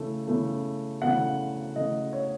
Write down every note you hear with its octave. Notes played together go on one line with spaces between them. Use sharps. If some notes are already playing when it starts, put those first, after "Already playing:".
Already playing: C#3 E3 A3
C#3 E3 A3
C#3 E3 A3 F#5
C#3 E3 A3 D#5
C#5